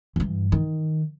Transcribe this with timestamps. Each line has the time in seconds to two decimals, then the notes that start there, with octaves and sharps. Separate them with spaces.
0.16 G2 E3
0.52 D#3